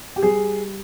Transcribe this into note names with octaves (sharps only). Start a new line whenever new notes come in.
G4
G3 G#4